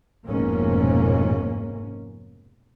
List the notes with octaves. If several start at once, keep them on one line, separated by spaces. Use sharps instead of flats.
F1 F2 G#2 B2 A#3 C#4